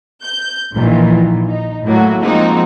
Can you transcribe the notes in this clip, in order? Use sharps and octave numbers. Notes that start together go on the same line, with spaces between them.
G6
A#1 A#2 D#3 E3
D#4
A2 F#3 A3 A#3 F#4
F3 G#3 A#3 C4 D#4 F#4